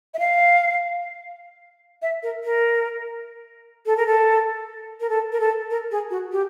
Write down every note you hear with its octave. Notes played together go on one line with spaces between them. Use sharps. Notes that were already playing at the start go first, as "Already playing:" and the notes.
E5
F5
E5
A#4
A#4
A4
A#4
A4
A#4
A4
A#4
A4
A#4
G#4
F#4
G4